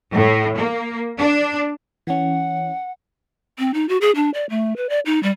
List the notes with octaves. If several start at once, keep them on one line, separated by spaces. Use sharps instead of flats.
A2
A#3
D4
E3 C#4 F#5
C4
D#4
F#4
G#4
D4
D5
A3
B4
D5
D#4
G3